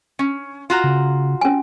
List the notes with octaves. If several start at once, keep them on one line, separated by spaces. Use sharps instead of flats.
C#4
F4 F#4 A#5
C#3
C#4 G#5